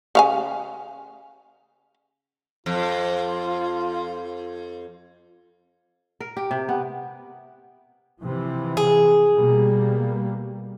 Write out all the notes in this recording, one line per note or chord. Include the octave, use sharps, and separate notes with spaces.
C#3 F5 G#5
F2 F4
A#4
G4
C3
B3
C3 E3 F3
G#4
B2 G3 A#3